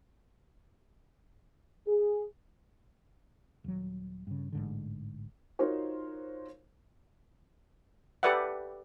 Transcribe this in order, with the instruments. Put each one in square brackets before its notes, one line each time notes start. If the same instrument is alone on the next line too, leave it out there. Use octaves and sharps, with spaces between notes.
[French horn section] G#4
[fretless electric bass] D#1 F#3
G2 C#3
A1 G#2 D3
[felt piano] D#4 F4 F#4 A#4 C5 C#5
[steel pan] G4 A4 B4 D5 E5 F#5